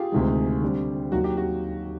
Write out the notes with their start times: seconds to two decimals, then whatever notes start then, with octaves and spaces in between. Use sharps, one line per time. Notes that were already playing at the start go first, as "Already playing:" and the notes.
Already playing: F4 G4 G#4
0.12 D2 C3 D#3 G#3
0.62 D3 G3 C4
1.12 D#2 D#3 F#3 F#4
1.24 G4
1.37 F#4